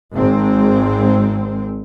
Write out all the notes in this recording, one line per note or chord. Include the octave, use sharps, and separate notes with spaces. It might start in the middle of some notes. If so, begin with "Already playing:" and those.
G#1 G#3 C4